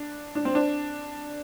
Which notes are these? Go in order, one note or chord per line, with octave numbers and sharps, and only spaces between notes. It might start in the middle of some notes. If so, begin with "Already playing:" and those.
Already playing: D4
D4
C4
D4